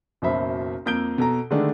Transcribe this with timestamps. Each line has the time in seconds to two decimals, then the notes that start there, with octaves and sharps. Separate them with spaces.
0.22 F#1 B1 F#2 C5 E5 B5
0.86 F2 A#3 G6 D7 G7
1.18 B2 A4 A#5
1.51 D3 D#3 G#3 A3 D4